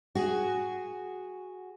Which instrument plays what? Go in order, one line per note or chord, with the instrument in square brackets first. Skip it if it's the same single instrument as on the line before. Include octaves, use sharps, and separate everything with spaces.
[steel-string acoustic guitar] F#4 G#4